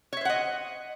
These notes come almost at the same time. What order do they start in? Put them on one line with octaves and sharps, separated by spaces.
C#5 E5 C5 F#5 D#5